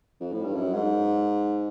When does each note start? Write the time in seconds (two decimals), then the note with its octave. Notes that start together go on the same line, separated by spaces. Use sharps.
0.20 F2
0.33 A2
0.44 G2
0.55 F#2
0.74 G#2